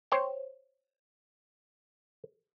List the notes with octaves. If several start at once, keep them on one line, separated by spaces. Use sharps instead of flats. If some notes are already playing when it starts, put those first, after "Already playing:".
C5 C#5 G5